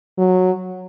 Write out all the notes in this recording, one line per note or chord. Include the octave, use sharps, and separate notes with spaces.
F#3